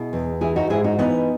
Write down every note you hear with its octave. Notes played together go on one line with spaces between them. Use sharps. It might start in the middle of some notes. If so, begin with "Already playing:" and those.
Already playing: B2 E4 G#4
E2
E3 E4 G#4
D#4 F#4
G#2 E4 G#4
D#4 F#4
E3 B3 D#4